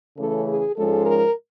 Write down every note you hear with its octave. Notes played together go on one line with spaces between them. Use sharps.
C#3 E3 A3 C#4 A4
G#4
G#2 F3 G#3 C#4 A4
A#4